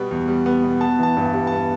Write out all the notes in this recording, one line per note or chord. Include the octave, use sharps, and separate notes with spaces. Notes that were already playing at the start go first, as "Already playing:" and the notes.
Already playing: B2 G3 B3
E2
G3
B3
B2
B3 A5
E3 A5
G2
A5
G3
B3 A5